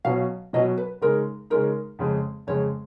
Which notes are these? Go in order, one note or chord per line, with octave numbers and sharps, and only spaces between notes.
B2 F#3 C#4 F5
B2 F#3 C#4 D#5
B4
C#3 G#3 D#4 A#4
C#3 G#3 D#4 A#4
F2 C#3 G#3
F2 C#3 G#3 C#5